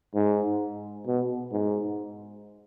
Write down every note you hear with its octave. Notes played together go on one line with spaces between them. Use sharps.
G#2
B2
G#2